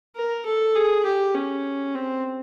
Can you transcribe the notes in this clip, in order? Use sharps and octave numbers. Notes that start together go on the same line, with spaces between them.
A#4
A4
G#4
G4
C#4
C4